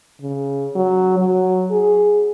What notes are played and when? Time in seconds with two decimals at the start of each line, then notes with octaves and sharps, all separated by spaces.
0.21 C#3
0.75 F#3
1.18 F#3
1.71 G#4